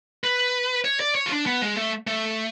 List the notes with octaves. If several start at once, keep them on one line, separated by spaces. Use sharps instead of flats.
B4
C#5
D5
C#5
F4
D4
B3
G#3
A3
A3